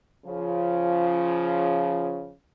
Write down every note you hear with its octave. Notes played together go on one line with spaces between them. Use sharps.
C#3 F3